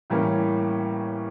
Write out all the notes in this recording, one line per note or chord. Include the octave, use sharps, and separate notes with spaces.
A2 E3 G3 A#3 C#4